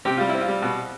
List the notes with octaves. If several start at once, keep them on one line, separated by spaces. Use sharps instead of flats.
C3 G4
G3 F4
E4
C4
F4
G3
B2